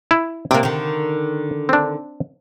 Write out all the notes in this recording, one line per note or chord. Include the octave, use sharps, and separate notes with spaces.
E4
C3 A#3 D4
D3 D#3
C4 D4